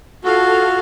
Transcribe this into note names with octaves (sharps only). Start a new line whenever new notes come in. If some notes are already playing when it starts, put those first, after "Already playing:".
F4 F#4 A4 F5